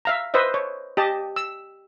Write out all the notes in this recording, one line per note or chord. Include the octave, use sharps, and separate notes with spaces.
E5 F5 A#5
B4 C5 D#5 E5
C#5
G4 D#5 A5
E6